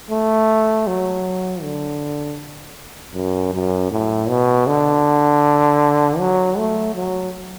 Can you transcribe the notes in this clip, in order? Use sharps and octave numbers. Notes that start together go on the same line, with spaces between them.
A3
F#3
D3
F#2
F#2
A2
B2
D3
F#3
A3
F#3